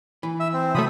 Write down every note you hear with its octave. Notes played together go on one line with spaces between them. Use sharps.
E3
E5
C4
C3 F#3 A3 B5 D#6